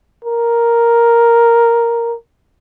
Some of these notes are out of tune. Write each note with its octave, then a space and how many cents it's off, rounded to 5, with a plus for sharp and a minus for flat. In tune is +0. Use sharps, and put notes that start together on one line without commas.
A#4 +0